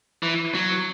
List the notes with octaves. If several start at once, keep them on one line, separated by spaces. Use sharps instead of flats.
E3
F#3